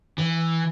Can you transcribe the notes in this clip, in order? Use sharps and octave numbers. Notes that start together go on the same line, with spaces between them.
E3